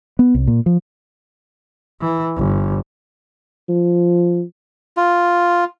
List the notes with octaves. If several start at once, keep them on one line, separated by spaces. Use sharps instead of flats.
B3
C2
A#2
F3
E3
G1
F3
F4